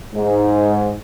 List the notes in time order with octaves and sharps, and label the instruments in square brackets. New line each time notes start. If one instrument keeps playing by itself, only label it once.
[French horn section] G#2